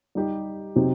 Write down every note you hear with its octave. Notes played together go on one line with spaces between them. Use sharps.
G3 D#4 G4
C3 F#3 C4 D#4 G4